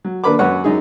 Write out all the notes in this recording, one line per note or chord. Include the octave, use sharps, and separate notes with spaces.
F#3
D#2 D4 A#4 B4 B5 D6
F#2 B4 C#5 F#5
F#2 D#4 G#4